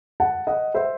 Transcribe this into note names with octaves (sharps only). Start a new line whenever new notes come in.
F#5 A5
D#5 F#5
C5 E5